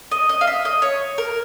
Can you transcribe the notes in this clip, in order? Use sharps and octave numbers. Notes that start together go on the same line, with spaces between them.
D#5
D#5
F5
E5
D#5
C#5
A#4